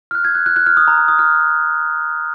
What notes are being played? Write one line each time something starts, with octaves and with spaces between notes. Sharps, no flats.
F6
F#6
G#6
F#6
F#6
F#6
F6
D#6
A#5
A#5
D#6
F6